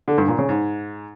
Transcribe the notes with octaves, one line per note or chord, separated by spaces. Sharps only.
D3
G2
A#2
C#3
G#2